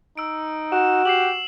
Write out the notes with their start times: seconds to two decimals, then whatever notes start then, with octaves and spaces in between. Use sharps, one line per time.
0.17 D#4 E6 D7
0.72 F#4 E7
1.05 G4 C7 E7 F#7